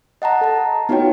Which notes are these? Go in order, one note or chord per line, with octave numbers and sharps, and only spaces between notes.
D#5 F#5 A5 A#5
A4 A5
B3 D#4 F4 F#4 C#5 G5